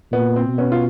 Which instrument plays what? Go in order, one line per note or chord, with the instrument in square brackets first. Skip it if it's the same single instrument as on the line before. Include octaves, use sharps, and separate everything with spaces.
[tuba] A#2 [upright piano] B3
[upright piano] C4
[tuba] B2
[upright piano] B3 C#4
F4